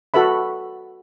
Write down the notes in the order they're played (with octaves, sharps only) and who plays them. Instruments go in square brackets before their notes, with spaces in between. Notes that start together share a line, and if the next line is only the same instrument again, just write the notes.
[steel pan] F#4 A4 B4 E5 B5